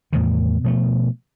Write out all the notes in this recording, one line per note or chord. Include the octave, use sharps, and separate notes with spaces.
E2 A2 C3 D#3
B2 F3 G3 A3